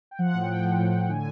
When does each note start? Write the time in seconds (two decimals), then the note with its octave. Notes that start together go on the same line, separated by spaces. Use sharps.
0.11 G5
0.19 F3 F#5
0.34 A2
0.42 G5
0.50 F3
0.64 F3
0.80 A2
0.94 A2
1.09 D3 G#5